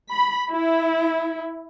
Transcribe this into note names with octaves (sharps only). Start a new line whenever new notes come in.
B5
E4